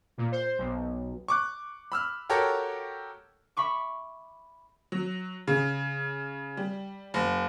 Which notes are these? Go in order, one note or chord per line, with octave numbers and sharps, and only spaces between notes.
A#2
C5
B1
C#6 D6 F#6
B5 E6 F6
F#4 G4 A4 A#4 C#5
E5 B5 C#6 D6
F#3
C#3
G3
F#1